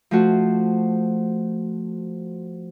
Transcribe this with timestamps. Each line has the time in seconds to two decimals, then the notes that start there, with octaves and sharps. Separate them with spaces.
0.11 F3 A3 F#4